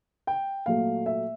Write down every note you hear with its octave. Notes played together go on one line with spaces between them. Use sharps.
G5
A#2 F#3 A3 F5
E5